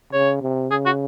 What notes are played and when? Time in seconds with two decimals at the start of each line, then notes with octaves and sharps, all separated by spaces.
0.13 C#3 C#5
0.41 C3
0.71 C#3 G#4
0.86 F#4